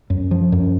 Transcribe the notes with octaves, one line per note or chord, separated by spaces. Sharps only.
F#2
F3
F#2